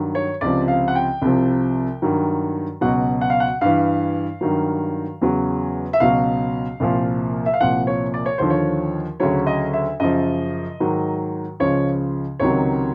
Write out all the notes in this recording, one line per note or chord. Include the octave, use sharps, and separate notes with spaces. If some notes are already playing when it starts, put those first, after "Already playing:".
Already playing: G2 D#3 F#3
C#5
C#2 C3 F3 D5
F5
F#5
G5
C2 C3 F3
G2 D#3 F#3
C#2 B2 F#3 F#5
F#5
F5
F#5
G2 E3 F5
G2 D#3 F#3
E2 C#3 F#3
E5
C#2 B2 F#3 F5
C2 A#2 F3
E5
F5
C2 A#2 F3 F#5
C#5
D5
C#5
D#2 D3 F3 C5
C#5
D2 C#3 F#3 C#5
D#5
E5
F#2 C#3 F3 D#5
G#2 D#3 F#3
C#2 C#3 F3 C#5
C#2 C3 D#3 F#3 C#5